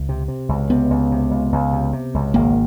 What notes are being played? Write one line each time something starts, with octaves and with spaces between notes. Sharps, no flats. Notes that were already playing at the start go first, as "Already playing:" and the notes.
Already playing: C#2
C3
C3
C#2
C3 B3
C#2
C3
C#2
C#2
C3
C3
C#2
G#1 A#3